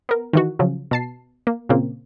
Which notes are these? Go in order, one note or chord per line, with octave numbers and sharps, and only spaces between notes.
B3 A#4
D#3 E3 F#4
C#3 F3 F#3
B2 A5 C7
A#3
A#2 C#3 A#3 C4